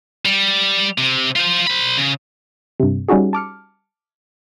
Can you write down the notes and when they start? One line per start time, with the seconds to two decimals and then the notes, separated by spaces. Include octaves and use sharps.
0.25 G3
0.98 C3
1.36 F4 C5
1.67 C5 B5
1.97 C#3
2.80 G2 C3
3.08 G3 C#4 D#4 F#4 G#4
3.33 A5 D6 F6 C#7